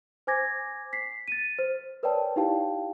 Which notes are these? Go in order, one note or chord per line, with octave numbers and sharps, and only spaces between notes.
C5 G#5 D6 G#6 A#6
B6 C7
A6 D#7
C5
A#4 B4 C#5 D5 G5 A5
D#4 E4 G4 F5 G5 A5